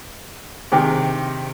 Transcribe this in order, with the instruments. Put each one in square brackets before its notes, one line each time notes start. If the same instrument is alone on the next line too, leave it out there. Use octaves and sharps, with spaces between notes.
[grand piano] C3 D#3 [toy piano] D4 G#4 C5 G5 A#5